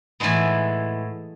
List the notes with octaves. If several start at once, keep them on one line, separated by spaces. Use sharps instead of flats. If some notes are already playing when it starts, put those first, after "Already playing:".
A2 E3 G#3 B3